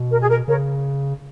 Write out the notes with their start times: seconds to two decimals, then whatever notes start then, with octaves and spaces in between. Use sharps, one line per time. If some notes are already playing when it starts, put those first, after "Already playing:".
Already playing: B2
0.12 A#4
0.21 G#4
0.30 A#4
0.48 C#3 A#4 C#5